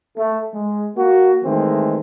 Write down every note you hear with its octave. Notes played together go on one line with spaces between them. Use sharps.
A3
G#3
A#3 F#4
D#3 E3 G#3 A3 C4